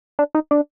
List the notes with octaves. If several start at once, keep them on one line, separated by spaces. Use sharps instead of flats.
D4
D#4
D4